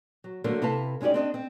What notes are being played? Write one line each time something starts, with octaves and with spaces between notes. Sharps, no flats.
F#3
D3 F#3 A3 A#3 A#4 C5
C3 E4 A4 B4 F5 A5
G#3 C#4 D#4 G4 D5
C4 D4 D#5
C4